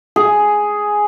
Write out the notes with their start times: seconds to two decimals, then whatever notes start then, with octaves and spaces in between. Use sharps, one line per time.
0.16 G#4